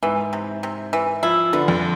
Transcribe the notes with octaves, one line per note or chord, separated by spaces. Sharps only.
G#2 E3
C3
C3
E3
F3 E4
D3 B3
F2